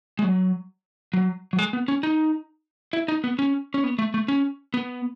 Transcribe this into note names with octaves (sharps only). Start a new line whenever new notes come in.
G#3
F#3
F#3
F#3
G#3
B3
C#4
D#4
E4
D#4
B3
C#4
C#4
B3
A3
A3
C#4
B3